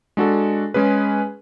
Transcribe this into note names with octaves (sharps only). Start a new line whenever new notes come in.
G#3 D4 F#4 A4
G#3 C#4 G#4 B4